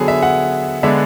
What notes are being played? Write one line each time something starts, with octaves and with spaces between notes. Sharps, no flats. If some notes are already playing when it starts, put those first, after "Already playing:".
Already playing: D3 F#3 B3 G#4 A4
E5
F#5
D3 G#3 B3 D4 E5